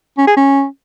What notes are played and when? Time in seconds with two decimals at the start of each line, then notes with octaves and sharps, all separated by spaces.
0.17 C#4
0.27 G#4
0.36 C#4